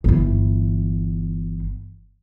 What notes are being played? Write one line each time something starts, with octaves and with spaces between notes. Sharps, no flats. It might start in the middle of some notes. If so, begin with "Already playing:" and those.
G1 E3